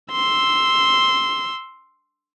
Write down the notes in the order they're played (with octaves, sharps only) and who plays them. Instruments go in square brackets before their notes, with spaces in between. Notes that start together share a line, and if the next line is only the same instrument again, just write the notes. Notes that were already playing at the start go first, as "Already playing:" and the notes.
[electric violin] C6 E6